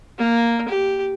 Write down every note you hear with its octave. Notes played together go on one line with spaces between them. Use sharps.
A#3
G4